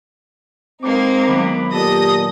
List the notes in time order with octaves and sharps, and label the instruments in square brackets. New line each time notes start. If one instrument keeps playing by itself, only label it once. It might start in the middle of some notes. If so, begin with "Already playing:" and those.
[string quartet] G#3 A#3 D#4 [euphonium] C4 [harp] D6
[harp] D#3 F#3 B3 [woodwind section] B5 D6
[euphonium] A#2 [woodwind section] G4 [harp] A4 A5 [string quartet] D#5 D#6 A#6